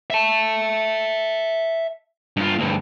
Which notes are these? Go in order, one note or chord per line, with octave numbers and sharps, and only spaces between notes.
E5 A5
G2 F4
D2 G2